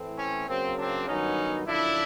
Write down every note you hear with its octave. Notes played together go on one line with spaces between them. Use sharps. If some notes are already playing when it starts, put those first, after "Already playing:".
Already playing: A2 E3 A3 C4
C#4
C#3 F#3 A#3 C4
C4 D4
G2 D#3 F#3 B3 C#4 D#4
F#2 D3 F3 D4 E4